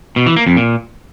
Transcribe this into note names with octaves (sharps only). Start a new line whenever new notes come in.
B2
E3
A#3
F2
A#2